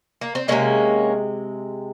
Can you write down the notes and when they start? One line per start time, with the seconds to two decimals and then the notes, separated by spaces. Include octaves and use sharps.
0.21 A#3
0.35 C4
0.48 C3 D#3 G#3 A#3 C#4